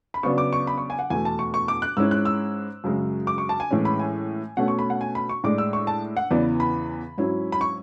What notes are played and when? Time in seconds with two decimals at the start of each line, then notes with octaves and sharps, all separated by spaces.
0.14 B5
0.23 C#3 F#3 B3 D4 C#6
0.38 D6
0.53 C#6
0.67 B5
0.78 C#6
0.90 G#5
0.99 F#5
1.10 E2 B2 A3 G#5
1.25 A5
1.39 C#6
1.54 C#6
1.68 D6
1.82 F#6
1.97 G#2 G#3 C#4 E4 E6
2.11 F#6
2.25 E6
2.84 F#2 C#3 G#3
3.27 D6
3.38 C#6
3.49 A5
3.60 G#5
3.71 A2 E3 G#3 C#4
3.85 B5
3.99 G#5
4.57 B2 A3 C#4 F#5
4.68 C#6
4.79 B5
4.90 F#5
5.01 G#5
5.15 B5
5.29 C#6
5.44 A2 G#3 D4 D6
5.58 E6
5.73 C#6
5.87 A5
6.17 F#5
6.31 E2 C#3 E3 B3 D5
6.60 B5
7.18 G#2 F#3 C#4 E4
7.52 B5
7.61 C#6